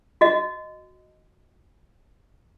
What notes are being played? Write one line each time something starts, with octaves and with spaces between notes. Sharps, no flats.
F#4 D#5